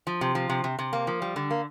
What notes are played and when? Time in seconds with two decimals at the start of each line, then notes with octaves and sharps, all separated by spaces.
0.07 F3
0.21 C3
0.35 F3
0.49 C3
0.64 C3
0.79 C3
0.93 A#3
1.07 F3
1.22 G3
1.36 D3
1.50 A#3